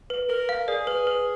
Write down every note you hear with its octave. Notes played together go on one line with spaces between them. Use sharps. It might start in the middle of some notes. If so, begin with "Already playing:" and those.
B4
A#4 B4
F5
G#4 D5
B4
B4